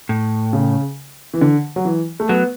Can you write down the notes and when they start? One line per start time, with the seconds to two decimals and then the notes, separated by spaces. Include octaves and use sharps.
0.09 A2
0.53 C#3
1.34 E3
1.41 D3
1.76 F#3
1.85 E3
2.20 A3
2.29 F#3 B3